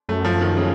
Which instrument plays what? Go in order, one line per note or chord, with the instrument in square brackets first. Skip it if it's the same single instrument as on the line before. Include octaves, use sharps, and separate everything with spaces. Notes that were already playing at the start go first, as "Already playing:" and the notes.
[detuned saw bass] F#2 [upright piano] A3
[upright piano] F3
D#3
C#3